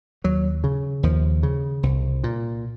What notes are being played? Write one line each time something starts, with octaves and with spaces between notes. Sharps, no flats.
D#2 F#3
C#3
D#2 F3
C#3
C2
A#2